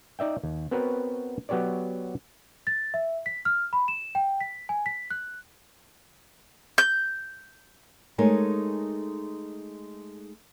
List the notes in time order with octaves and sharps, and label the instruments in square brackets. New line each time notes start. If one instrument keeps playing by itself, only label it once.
[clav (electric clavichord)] D#4 D5 E5 G5
D#2
B3 C4 F#4 A#4 B4 C#5
F#3 B3 G4 C#5 D5
[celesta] A6
E5
B6
F6
B5
E7
G5
B6
G#5
B6
F#6
[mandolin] G6
[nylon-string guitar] G#3 A3 D#4 A#4 C#5 G#5